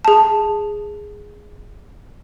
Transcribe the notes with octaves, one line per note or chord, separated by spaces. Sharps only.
G#4 A5